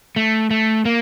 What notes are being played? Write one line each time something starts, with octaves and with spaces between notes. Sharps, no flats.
A3
A3
A#3